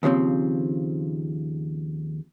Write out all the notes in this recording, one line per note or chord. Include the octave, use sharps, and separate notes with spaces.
D#2 C#3 F3 C4